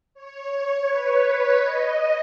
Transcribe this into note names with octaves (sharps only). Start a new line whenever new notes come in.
C#5
B4
C#5
D#5